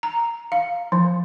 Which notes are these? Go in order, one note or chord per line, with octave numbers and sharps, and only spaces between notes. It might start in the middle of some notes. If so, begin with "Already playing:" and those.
A#5
F5
F3